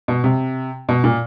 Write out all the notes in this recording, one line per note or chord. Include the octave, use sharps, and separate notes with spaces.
B2
C3
B2
A#2